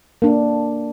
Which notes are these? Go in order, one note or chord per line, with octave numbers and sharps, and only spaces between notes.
A#3 D4